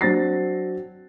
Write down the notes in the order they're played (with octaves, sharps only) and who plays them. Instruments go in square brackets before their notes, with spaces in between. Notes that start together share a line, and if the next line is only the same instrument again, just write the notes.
[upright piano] F#3 C4 D4 A6 A#6 C7